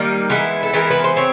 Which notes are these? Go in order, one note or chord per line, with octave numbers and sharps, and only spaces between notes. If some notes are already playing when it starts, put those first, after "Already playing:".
Already playing: D#3 G3 A#3 D#4
E3 G#3 B3 E4
A4
E3 G#3 B3 E4 A#4
B4
C5
C4 C#5